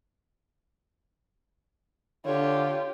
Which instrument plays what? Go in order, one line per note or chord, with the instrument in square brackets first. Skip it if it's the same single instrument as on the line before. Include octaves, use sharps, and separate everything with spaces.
[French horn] D3 [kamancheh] F4 G4 [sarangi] C#5